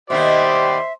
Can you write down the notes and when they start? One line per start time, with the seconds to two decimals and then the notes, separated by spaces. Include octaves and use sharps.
0.10 B2 D#3 A#3 G4 C5 D5 E5 C6